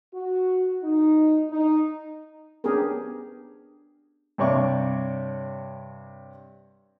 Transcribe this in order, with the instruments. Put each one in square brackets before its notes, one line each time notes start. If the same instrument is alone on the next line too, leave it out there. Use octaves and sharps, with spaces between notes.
[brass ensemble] F#4
D#4
D#4
[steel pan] B3 C#4 D4 G4 G#4 A#4
[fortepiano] G2 C3 C#5 D5 C#6 D6